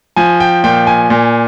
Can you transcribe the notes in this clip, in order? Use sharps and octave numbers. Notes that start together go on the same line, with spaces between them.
F3 G#5
G5
A#2 G5
G#5
A#2